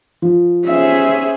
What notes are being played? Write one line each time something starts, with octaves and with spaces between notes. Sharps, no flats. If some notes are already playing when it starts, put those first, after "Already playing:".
F3
C#4 G#4 C5 E5